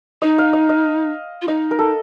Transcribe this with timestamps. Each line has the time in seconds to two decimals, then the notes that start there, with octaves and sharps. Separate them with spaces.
0.22 D#4 D#5
0.38 F5
0.53 D#5
0.69 D#5
1.42 F4
1.48 D#4 D#5
1.71 A#4
1.79 A4